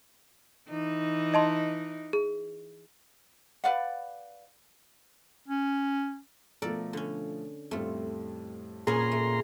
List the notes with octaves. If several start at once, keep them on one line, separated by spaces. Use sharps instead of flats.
E3 D#4
D#5 A5 C6
G#4
B4 D5 F5 F#5
C#4
B2 F3 A3 A4 A#4 D5
D3 C#4
F2 A2 G3 A3 F4
A#2 A#3 B3 C#4 G#4 A#5 C6
A3